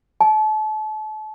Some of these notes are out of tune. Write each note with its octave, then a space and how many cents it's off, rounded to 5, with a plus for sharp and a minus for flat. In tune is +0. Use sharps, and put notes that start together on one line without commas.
A5 -35